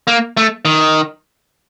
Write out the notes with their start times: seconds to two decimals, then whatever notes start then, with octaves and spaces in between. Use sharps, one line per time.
0.07 A#3
0.37 A3
0.65 D#3